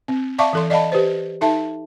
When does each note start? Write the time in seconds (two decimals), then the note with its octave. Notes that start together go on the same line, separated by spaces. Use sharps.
0.08 C4
0.38 D5 E5 F5 A5 C#6 D6
0.53 E3 A4 C6
0.70 D5 D#5 F5 A5 B5
0.92 G4 B4 C5
1.41 D#4 A4 E5 A5